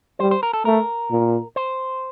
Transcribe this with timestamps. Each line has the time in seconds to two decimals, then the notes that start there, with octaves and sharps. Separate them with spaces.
0.19 G3 C5
0.31 C5
0.43 A#4
0.53 A4
0.65 A3 A#4
1.11 A#2
1.56 C5